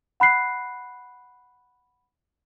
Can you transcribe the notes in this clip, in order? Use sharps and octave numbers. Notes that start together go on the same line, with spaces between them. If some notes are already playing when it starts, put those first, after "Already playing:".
F#5 B5 F#6 C7